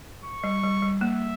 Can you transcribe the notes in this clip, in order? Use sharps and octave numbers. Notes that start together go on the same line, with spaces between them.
C#6
G3
G3
G3
A#3 E5